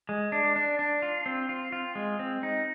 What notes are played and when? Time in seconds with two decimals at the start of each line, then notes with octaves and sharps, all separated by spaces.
0.09 G#3
0.32 D4
0.56 D4
0.79 D4
1.02 F4
1.26 C4
1.49 F4
1.72 F4
1.95 G#3
2.19 C4
2.43 D#4